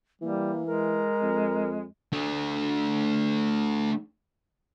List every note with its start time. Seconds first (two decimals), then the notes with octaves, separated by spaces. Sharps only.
0.21 E3 G3 A#3
0.66 G#3 A#4
1.22 F2
2.12 A3 D4